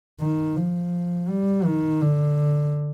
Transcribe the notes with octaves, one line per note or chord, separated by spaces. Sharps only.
D#3
F3
G3
D#3
D3